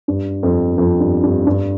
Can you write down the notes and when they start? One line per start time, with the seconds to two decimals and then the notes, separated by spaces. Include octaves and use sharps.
0.08 G2
0.43 F2
0.78 F2
1.00 G2
1.23 G2
1.47 G2